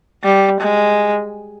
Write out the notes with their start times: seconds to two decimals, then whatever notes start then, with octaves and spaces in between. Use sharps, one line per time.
0.24 G3
0.60 G#3